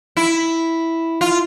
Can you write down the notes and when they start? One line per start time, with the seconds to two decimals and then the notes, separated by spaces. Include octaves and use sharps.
0.17 E4
1.21 F4